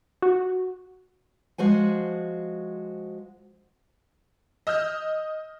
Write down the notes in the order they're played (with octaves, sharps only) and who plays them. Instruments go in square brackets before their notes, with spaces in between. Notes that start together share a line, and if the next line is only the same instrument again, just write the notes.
[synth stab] F#4
[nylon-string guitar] F3 G#3 F#4 C5 G#5
[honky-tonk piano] D#5 E6 F6 G6